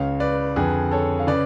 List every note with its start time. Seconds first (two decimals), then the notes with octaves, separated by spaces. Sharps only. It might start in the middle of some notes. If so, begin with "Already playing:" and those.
Already playing: C#2 C#3 C#5 F5
0.20 B4 D5
0.56 F2 D3 G#4 B4
0.91 A4 C#5
1.19 F5
1.27 C#3 B4 D5